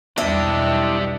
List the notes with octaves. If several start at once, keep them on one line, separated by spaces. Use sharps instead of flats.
B1 E2 G3 D4 E4 G4 D#5 E5